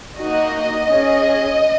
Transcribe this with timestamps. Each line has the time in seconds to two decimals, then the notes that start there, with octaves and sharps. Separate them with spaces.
0.18 A#3 D#4 F#4 D#5
0.89 C#4 G#4